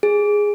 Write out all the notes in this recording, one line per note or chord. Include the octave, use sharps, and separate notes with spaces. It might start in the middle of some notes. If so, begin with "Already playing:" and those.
G#4